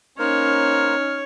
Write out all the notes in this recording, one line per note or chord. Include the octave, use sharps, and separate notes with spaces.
A#3 C#4 D#4 A#4 C5 C#5 F6